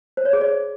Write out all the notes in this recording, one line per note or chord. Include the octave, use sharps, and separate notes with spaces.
C5
C#5
G#4
D5